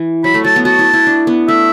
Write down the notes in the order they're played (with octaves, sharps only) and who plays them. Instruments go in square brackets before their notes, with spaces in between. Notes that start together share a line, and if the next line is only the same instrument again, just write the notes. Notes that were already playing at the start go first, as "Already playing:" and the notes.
Already playing: [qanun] E3
[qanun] F#3 [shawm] B5
[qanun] A3
[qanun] F#3 [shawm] A5
[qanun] B3
[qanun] F#4 [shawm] A5
[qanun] E4
E4
D4
B3
[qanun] A3 [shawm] E5